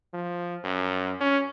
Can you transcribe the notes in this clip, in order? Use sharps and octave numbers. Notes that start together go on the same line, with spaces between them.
F3
F#2
C#4